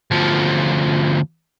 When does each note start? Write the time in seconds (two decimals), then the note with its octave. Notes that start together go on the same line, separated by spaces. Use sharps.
0.11 D2 F3